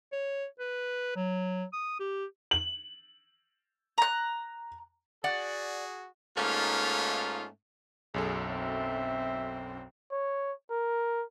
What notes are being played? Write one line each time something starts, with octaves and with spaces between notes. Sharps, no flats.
C#5
B4
F#3
D#6
G4
F#7
A#5 F#6
F#4 G#4 D5 F#5
G#2 A3 A#3 C#4 D#4 F4
B1 F#2 G#4 A4
C4 E5
C#5
A#4